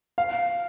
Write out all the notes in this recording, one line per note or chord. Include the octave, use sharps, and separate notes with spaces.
F5